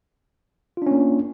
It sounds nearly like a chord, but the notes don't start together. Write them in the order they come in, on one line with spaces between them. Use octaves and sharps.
F4 D4 C#4 A#3